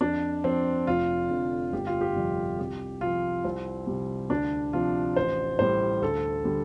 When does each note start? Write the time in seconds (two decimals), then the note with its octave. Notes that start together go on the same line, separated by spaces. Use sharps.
0.01 F2 D4
0.44 F3 C4
0.87 F1 F4
1.30 F2 D3 F3
1.73 G1 G4
1.87 F4
2.01 G4
2.16 F2 C3 G3
2.59 C2 G4
3.01 C3 F3 F4
3.44 C2 C4
3.87 C3 G3
4.30 D2 D4
4.73 C3 F3 F4
5.16 A1 C5
5.59 A2 G3 C5
6.01 D2 A4
6.45 D3 G3